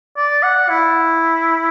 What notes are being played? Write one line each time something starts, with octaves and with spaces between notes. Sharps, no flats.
D5
F#5
E4